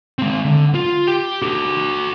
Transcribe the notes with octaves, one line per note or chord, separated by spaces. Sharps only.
G#3 C4
D3
F4
G4
F#4 A4